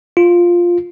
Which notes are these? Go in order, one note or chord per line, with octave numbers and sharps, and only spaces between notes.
F4